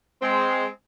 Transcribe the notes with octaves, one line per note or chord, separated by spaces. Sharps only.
G#3 C4